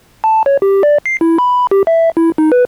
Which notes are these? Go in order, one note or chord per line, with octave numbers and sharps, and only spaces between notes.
A5
C#5
G4
D5
C7
E4
B5
G4
E5
E4
D#4
B4